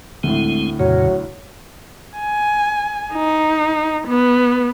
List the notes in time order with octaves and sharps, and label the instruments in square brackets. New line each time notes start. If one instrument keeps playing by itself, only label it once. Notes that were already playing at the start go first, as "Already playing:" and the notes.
[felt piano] D2 A2 [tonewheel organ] G#3 C4
[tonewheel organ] F2 A#2 C#3 [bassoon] F#3
[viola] G#5
D#4
B3